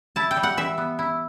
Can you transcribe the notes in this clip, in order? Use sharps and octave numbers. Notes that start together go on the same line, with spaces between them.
E4 A5
G5
G3
F#5
E3 E5
B3
E4